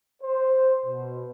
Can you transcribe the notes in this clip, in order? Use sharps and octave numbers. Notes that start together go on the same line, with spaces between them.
C5
B2